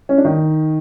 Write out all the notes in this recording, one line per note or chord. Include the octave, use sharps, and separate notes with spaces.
C#4
D4
D#3 D#4